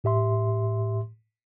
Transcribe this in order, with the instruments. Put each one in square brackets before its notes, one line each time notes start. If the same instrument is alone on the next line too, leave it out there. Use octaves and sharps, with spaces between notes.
[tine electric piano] A2 G4 E5 C6